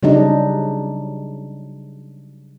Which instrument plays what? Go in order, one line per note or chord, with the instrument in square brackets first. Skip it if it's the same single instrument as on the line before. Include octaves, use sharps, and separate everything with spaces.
[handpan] C#3 F#3 G3 D4 D#4